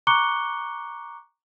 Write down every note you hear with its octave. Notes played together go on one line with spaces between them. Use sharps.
A#5 C#6 D6 F#6 C#7 G7